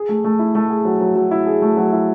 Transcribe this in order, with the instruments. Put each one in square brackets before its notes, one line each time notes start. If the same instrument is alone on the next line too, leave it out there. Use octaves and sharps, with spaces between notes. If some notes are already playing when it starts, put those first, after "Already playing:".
Already playing: [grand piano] G#4
A3
A3
E4
A3
G#4
F#3
F#3
F#3
E4
G#4
A3
F#3
E4